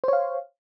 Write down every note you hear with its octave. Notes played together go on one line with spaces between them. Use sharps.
C5 C#5 F5